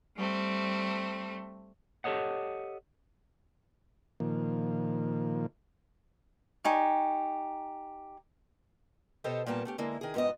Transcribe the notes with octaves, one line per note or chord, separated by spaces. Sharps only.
G3 A3 C4
G4 A4 C#5 D#5 F#5
A#2 D#3 F3 A#3
D#4 G4 G#5 C#6
B2 G4 A4 C5 C#5 D#5
A#2 G3 A#3 B3 A5
A3 C#4 G4
D3 G#3 A#3 E4
D#3 G#4
F2 G#2 B3 D5 D#5